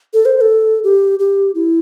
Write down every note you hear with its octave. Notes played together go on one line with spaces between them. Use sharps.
A4
C5
C5
A4
G4
G4
E4